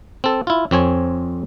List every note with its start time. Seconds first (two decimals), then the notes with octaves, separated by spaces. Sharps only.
0.24 C4 A4
0.47 E4 F4
0.71 F2 C4 C#5 G#5